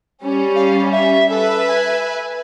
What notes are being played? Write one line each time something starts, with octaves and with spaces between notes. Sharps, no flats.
G3 C#4
F5
E5
A4 B4 E5
G#5